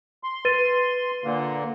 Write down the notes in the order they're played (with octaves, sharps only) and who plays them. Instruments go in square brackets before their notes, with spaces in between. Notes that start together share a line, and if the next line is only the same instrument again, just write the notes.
[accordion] C6
[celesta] B4 A6 D#7
[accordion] A#2 D3 A#3